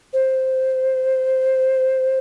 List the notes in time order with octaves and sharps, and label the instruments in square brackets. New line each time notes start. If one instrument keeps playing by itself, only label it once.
[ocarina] C5